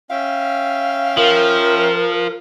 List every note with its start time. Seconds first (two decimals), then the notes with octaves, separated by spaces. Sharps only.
0.10 C#4 E5 F5 G5
1.17 F3 A#4